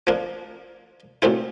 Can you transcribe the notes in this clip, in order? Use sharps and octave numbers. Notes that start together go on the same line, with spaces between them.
F3 A#3 D4
A#2 F#3 A3 C4 E4